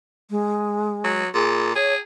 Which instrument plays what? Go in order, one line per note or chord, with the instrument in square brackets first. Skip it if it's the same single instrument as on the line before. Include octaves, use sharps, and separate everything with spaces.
[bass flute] G#3
[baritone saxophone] F#3
[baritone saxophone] A#2 [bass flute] G#4
[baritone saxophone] G#4 [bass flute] C#5